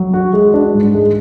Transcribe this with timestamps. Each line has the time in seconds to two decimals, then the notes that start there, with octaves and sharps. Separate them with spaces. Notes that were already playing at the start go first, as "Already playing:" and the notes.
Already playing: F#3
0.14 F#4
0.33 G#3
0.54 D4
0.74 G#2
0.94 G#3